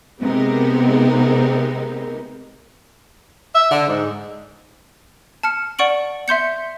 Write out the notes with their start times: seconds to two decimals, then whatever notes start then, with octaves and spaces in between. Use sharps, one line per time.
0.21 C3 G#3 B3 C4 D#4 A#4
3.54 E5
3.71 D3
3.88 G#2
5.43 A5 F6 C#7
5.79 D5 F#5 C#6 D7 F#7
6.28 E5 C6 G6 C#7